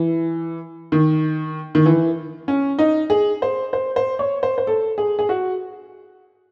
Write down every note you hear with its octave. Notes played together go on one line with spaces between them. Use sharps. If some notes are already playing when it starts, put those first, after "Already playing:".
Already playing: E3
D#3
D#3
E3
C#4
D#4
G#4
C5
C5
C5
C#5
C5
C5
A4
G#4
G#4
F#4